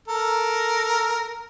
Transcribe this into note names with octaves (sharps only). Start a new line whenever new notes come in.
A4 A#4